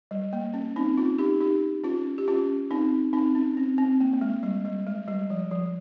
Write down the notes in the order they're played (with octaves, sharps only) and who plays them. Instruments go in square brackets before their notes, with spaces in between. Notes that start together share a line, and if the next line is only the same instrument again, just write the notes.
[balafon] G3
A#3
C#4
C4 D#4
C#4 F4
D#4 G4
D#4 G4
C#4 F4
G4
C#4 F4
C4 D#4
C4 D#4
C#4
C4
C4
A#3
A#3
G#3
G3
G3
G#3
G3
F3
F3